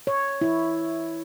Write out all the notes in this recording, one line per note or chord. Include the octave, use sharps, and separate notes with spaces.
C#5
E4